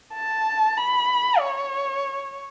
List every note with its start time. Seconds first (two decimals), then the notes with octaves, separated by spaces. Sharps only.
0.14 A5
0.77 B5
1.39 C#5